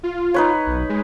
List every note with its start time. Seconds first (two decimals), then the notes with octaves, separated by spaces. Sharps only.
0.03 F4
0.34 D#4 B4 C#5
0.67 B1
0.89 G#3